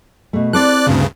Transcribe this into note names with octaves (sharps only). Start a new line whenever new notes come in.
B2 A3
C4 E4 A4 D5 D6 F#6
D2 G2 C#3